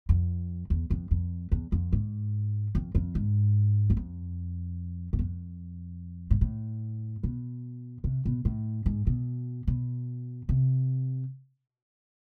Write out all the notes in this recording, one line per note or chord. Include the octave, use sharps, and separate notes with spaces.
F2
E2
F2
F2
E2
F2
G#2
F2
F2
G#2
E2
F2
G#2
F2
G#2
A2
B2
C3
B2
A2
G#2
B2
B2
C3